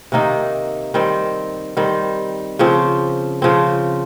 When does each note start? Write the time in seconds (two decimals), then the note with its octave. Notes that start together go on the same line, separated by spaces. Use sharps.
0.12 C3 D#3 A#3 D#4
0.94 D#3 G3 C4
1.77 D#3 G3 C4
2.59 C#3 F3 C4
3.42 C#3 F3 C4